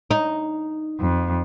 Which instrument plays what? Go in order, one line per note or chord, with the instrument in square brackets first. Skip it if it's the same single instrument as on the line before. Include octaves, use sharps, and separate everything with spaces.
[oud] D#4
[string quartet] F2